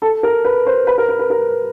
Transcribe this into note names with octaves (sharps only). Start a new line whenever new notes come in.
A4
A#4
B4
C5
B4
A#4
B4
B4
A#4